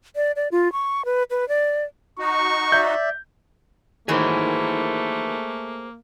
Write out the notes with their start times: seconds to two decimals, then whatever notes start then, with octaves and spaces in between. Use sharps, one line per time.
0.16 D5
0.36 D5
0.52 F4
0.72 C#6
1.05 B4
1.30 B4
1.49 D5
2.19 D#4 F#4 C#6
2.72 D5 E5 G6
4.08 D#3 E3 F#3 A3 A#3 G#4 C5